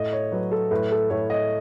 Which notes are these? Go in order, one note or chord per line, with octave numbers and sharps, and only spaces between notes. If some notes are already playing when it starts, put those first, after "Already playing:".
Already playing: A2 D#5
C#5
F#3 B4
A4
A2 B4
A4
A2 C#5
D#5